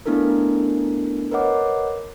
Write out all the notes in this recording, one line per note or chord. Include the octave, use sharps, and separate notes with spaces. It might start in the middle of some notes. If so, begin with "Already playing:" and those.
A3 B3 D4 E4 A4 A#4
A#4 B4 C#5 D#5 F#5 D6